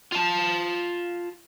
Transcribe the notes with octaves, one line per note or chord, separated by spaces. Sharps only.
F4 A5